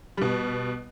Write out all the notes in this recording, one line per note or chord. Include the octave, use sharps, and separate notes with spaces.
B2 G3